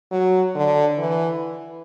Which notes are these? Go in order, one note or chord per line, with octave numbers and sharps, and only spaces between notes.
F#3
D3
E3